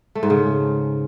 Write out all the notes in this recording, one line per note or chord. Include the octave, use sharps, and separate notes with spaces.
A3
G#2
C#3